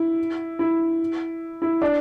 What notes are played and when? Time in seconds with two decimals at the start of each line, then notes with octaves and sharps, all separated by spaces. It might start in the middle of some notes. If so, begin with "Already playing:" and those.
Already playing: E4
0.59 E4
1.62 E4
1.82 D4